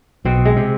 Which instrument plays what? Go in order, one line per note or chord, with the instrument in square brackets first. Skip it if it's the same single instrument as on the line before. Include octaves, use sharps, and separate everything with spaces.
[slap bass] B1 B2 [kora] C4
[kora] G#3
[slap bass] C3